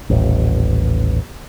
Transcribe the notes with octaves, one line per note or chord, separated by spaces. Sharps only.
D#1 A1